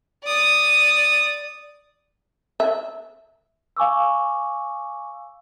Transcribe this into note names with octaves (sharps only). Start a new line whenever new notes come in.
D5 D#6
E5
F5 G#5 C#6 D6 E6